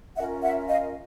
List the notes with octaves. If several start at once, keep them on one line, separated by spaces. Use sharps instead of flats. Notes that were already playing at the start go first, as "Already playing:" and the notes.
C#4 F4 A#4 E5 F#5
E5 F#5
D#5 F5